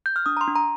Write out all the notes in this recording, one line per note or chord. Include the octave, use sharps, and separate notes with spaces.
G6
F6
D4 D#6
A#5
C6
D4
A#5